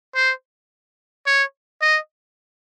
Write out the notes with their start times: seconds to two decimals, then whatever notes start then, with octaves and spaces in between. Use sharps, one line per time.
0.15 C5
1.27 C#5
1.82 D#5